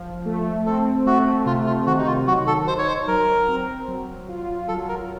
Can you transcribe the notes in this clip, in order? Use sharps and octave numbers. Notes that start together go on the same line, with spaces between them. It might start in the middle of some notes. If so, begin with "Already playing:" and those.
Already playing: F3
A3
C4 A4
A3 F#4
C3 F4
F4
D#3 F#4
D#4
F4
F#3 F#4
A4
D#4 C5
C#5
C5
F#3 A#4
C4
F#3
F4
F#3 A4
A#4